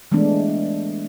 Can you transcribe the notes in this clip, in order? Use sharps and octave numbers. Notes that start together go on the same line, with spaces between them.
E3 G#3 A3 B3 D4